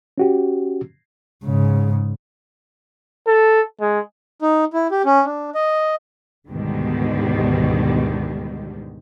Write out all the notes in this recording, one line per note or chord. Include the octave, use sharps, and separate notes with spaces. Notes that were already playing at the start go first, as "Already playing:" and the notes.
C#4 F#4 G4
G#2 C#3
A4
G#3
D#4
E4
G4
C#4
D4
D#5
D2 G#2 B2 D3 D#3 G3